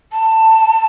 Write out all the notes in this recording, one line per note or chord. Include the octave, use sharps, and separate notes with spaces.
A5